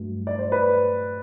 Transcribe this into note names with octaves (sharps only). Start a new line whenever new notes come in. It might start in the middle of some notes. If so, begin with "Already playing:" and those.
Already playing: G2 F#3 A3
D5
C5
B4